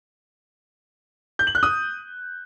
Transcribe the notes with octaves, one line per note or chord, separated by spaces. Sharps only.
G6
F#7
F#6
D#6